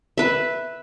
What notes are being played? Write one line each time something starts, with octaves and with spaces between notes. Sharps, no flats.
B4 E5